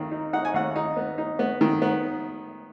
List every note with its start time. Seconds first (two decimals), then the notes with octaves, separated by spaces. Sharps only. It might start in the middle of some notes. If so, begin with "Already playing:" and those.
Already playing: D#2 D#3
0.11 D#4
0.33 D#4 F#5
0.45 G#5
0.54 D#2 F#5
0.76 D#4
0.97 B3
1.18 D#4
1.39 B3
1.61 D#3
1.82 B3